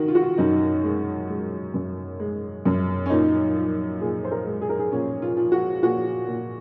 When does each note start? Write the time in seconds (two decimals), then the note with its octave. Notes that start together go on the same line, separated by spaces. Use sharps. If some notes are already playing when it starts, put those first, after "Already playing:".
Already playing: D#3 F#4
0.08 F4
0.15 F#4
0.22 F4
0.38 F#2 D#4
0.84 G#3
1.29 G#3
1.74 F#2
2.20 G#3
2.65 F#2
3.06 C#4
3.10 A#2 D#4
3.56 F3
4.01 A#2 G#4
4.25 C5
4.32 A#4
4.46 G#3
4.62 G#4
4.70 A#4
4.79 G#4
4.92 A#2 C#4
5.22 F4
5.37 F3
5.52 F#4
5.83 A#2 F#4
6.28 A#2